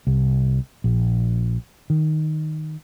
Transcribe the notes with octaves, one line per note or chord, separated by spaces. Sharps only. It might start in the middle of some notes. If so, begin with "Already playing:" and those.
C2
A#1
D#3